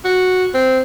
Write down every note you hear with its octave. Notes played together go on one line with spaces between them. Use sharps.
F#4
C4